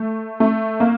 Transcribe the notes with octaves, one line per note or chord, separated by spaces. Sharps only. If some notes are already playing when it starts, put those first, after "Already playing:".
Already playing: A3
A3
A#3